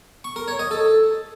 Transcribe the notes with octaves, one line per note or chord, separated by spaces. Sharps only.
C#6
A#4
C#5
D#5
A4